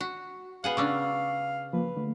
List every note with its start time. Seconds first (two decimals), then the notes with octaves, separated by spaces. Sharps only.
0.01 F#4
0.64 B3 G#4 F5 F#5
0.77 C#3 C#4 D4 C#6 D6 E6
1.73 F3 A#3 B4
1.97 D3 A3